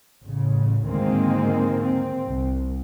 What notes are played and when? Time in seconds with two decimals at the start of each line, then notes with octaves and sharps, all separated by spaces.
0.24 A1 C#3
0.88 D2 G#2 D#3 G#3 A#3 C4
1.82 C4
2.26 C2